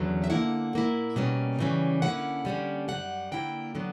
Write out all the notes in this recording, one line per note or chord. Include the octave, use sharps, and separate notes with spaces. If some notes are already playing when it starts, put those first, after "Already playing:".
Already playing: E2 D3 F#3 C#4
E5
D3 A#3 E4 F#5
A#2 A#3 E4
B2 G3 A#3 C#4
C#3 E3 G3 C#4
D3 A#3 C#4 E4 F#5
D3 G3 A#3 C#4
F#2 C#3 G3 F#5
D3 A#3 E4 G5
D3 F#3 B3